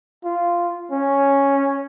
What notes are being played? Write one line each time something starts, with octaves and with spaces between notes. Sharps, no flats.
F4
C#4